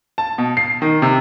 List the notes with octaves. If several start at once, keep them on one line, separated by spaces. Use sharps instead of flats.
A5
B2
C7
D#3
C3